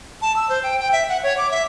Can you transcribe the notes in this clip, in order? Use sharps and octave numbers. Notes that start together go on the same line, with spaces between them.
A5
E6
C5
G5
G5
E5
F#5
C#5
D6
E5